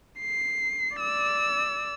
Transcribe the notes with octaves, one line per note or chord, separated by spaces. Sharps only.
C7
D5 E6